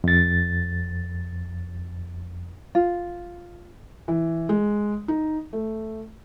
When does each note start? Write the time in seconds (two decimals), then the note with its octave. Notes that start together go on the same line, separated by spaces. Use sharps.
0.04 F2 A6
2.75 F4
4.08 E3
4.49 G#3
5.08 D#4
5.53 A3